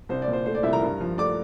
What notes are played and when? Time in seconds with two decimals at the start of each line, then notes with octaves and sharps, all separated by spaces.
0.09 C2 C5
0.22 D5
0.28 A#2
0.33 C5
0.46 A3 C5
0.55 D5
0.63 C2 E4 E5
0.72 A#4 A#5
0.82 G2
1.00 F3
1.18 A3 D5 D6